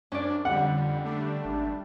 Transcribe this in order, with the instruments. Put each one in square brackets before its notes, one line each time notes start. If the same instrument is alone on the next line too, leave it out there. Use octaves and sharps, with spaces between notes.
[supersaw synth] F#2 [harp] C#4 D5 [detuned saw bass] D4
[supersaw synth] F2 G3 [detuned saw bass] D3 [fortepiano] F#5
[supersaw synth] G3 A3 D4
[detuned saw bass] G#1